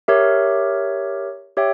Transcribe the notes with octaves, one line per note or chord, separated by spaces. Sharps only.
G4 A#4 C#5 E5
G4 C#5 E5 G5